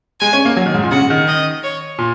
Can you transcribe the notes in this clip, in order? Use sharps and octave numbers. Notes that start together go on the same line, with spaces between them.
G#3 G#5
C#4
A#3
F#3
D#3
G#2
A#2
C#3 F#5
D#3
D#5
C#5
A#2